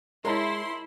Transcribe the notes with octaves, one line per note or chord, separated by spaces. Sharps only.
G#3 E4 A#4 C#5 A5 C6